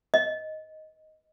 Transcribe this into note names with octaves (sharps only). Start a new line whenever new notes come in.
D#5